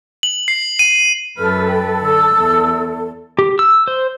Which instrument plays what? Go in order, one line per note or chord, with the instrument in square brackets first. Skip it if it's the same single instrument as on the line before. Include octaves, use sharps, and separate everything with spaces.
[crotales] F#7
C7
D#7
[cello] F#2 B4 [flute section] A4 [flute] F6
[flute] G5
[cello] D3 [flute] E6
[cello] E2
[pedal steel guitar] G4
E6
C5